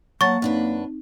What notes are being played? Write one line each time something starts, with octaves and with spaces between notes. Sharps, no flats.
F#3 A#3 F#5 A5 C#6 A6
F#2 C4 D4 D#4 B4